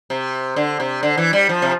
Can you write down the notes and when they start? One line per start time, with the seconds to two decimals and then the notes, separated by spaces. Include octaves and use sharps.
0.10 C3
0.56 D3
0.80 C3
1.03 D3
1.17 E3
1.33 G3
1.49 F3
1.62 C3